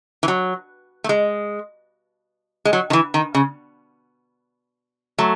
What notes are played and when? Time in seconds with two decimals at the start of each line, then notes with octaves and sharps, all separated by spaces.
0.23 E3
0.28 F#3
1.04 A3
1.09 G#3
2.65 G#3
2.73 F#3
2.90 D#3
2.93 E3
3.14 D#3
3.34 C#3
5.18 F#3 A3